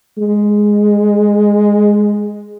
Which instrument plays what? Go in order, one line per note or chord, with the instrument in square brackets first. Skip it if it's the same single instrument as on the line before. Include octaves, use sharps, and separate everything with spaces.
[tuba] G#3